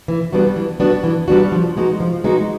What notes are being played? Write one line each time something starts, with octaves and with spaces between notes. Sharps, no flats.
E3
G3 B3 D4 F#4
E3
G3 B3 D4 F#4
E3
G3 B3 D4 F#4
F3
G#3 B3 D#4 F#4
F3
G#3 B3 D#4 F#4